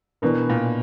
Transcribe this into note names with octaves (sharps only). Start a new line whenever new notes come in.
B2 E3 B3 D4 A#4
A#2